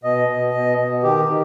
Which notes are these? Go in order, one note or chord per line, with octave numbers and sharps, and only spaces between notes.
B2 D#5
B2
B2
B2
D#3 G4
D#3